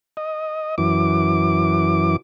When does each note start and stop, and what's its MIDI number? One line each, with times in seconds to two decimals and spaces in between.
0.17 0.75 75
0.78 2.16 42
0.78 2.16 52
0.78 2.16 86